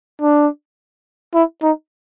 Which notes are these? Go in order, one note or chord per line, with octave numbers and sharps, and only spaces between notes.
D4
E4
D#4